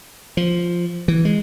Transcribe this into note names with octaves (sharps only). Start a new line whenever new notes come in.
F3
E3
G#3